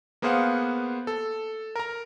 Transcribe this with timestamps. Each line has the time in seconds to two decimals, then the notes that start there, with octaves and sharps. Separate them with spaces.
0.22 A#3 B3 G#4 C5 F5 F#5
1.07 A4
1.76 A#4 A#5